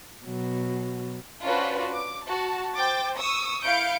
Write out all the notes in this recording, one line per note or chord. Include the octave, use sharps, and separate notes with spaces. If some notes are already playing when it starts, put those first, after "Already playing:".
B2 F#3
C#4 D4 F4 F#4 B4 C5
D6
F#4 A5
C5 G5 D6 A6
C#6 D#6 E6
E4 F5 G6 C#7 D7